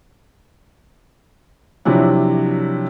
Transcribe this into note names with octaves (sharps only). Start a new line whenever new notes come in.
C3 F3 F#3 D4 E4